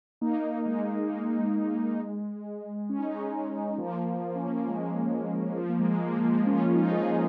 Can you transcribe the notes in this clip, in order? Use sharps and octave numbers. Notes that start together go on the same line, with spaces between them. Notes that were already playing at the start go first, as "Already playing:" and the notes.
A#3 D#4
G#3
A#3
G#3
C#4
D#4
G#3 C#4
G#3 C#4
F3 A#3
A#3
C#4
F3 A#3
G#3
F3
A#3
G#3
F3 A#3
F3 A#3
C#4 F4
C#4
D#4
F4
D#4 G#4